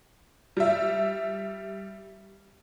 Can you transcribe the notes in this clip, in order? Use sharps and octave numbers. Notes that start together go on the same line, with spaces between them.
G3 E5